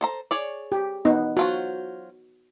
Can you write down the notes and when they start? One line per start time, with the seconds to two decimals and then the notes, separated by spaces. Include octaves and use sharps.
0.01 A4 C5 A#5
0.31 G#4 C#5 D5
0.72 G4
1.05 B3 D#4
1.37 F#3 F4 F#4 C5